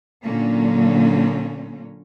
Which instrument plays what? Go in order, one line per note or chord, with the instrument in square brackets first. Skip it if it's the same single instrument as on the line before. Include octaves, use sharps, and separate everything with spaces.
[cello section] A#2 D3 F#3 A#3 C#4